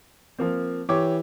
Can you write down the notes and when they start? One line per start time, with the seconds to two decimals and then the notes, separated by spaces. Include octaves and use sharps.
0.39 F3 A#3 C4
0.89 E3 G4 C#5 D6